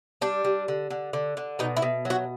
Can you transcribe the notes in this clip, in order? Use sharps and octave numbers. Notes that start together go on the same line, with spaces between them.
G3 D4
G3
D3
D3
D3
D3
B2 D#4
E4
B2
F#3
F#4